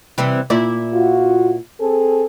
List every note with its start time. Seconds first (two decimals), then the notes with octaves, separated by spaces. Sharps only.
0.18 C3 E3 G3
0.50 A#2 E4 D5
0.94 F4 F#4
1.80 C4 G#4 A4